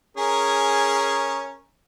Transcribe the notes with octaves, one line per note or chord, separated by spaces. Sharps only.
C#4 G#4 A#4